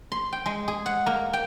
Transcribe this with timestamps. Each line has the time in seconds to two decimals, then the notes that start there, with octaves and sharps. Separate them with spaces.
0.12 C6
0.33 G5
0.46 G#3
0.68 G#4
0.86 F#5
1.06 A#3
1.33 G5